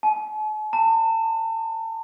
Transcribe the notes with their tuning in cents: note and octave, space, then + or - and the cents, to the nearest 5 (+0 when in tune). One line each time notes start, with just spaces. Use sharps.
A5 -45
A5 +40